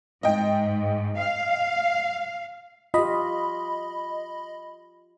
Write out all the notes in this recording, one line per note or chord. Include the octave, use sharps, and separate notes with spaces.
G#2 D#5 G5
F5
F4 G4 D#5 B5